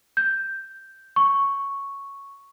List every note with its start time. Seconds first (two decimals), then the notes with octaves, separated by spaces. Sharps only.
0.17 G6
1.16 C#6